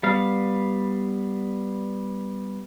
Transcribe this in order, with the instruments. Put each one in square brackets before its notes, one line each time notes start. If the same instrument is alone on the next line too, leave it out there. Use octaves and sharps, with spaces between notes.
[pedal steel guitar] G3 B3 F5